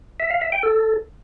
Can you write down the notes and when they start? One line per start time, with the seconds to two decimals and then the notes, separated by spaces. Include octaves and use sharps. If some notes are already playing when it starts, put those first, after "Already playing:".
0.20 E5
0.31 F5
0.41 E5
0.52 G5
0.63 A4